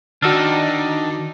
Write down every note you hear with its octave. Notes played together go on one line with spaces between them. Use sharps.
D#3 D4 D#4 F#4 E6 F6